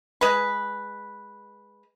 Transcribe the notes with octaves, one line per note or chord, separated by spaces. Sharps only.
G#3 B4